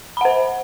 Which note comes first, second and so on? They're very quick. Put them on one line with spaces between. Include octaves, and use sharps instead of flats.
B5 F#5 C5